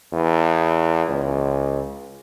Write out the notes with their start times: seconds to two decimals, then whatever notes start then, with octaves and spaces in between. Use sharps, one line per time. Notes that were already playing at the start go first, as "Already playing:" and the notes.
0.13 E2
1.08 C#2